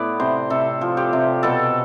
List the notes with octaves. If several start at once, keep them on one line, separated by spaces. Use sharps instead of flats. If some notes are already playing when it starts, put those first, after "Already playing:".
Already playing: A2 B3 D5
C3 C5
C3 A4
F3
G4
C3
B2 A4